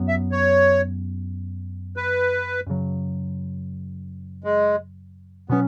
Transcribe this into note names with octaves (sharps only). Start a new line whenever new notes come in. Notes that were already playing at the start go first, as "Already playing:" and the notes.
Already playing: F#2 F#3 B3
E5
C#5
B4
F#2 C#3 F#3
G#3
B2 F#3 B3 C#4